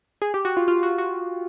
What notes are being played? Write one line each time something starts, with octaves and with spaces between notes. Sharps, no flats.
G#4
G4
F#4
F4
F4
F#4
F#4